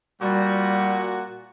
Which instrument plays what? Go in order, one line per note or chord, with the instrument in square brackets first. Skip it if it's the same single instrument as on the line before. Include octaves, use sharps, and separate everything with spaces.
[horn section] A#2 F#4 [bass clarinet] G3